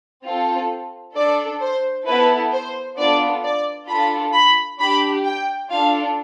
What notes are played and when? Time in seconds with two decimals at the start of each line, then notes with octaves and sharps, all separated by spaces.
0.26 C4 F4 A4
1.16 D4 A4 D5
1.62 C5
2.07 B3 E4 A4 B4
2.52 C5
2.98 B3 D4 F4 A4 D5
3.43 D5
3.89 D4 F4 A4 B5
4.34 B5
4.80 D4 G4 B5
5.25 G5
5.70 D4 F4 A4 F5